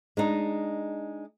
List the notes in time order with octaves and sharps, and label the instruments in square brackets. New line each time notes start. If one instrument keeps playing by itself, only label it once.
[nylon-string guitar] G#3 D4 D#4